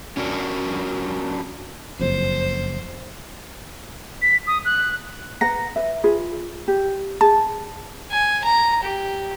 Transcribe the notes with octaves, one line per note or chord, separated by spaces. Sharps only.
C#4 D4 F#4 A#4
F#1 F2 C5
B6
D#6
F#6
B4 F#5 A#5 A#6
B4 E5
F4 G#4 B4
G4
G#4 A5
G#5
A#5
G4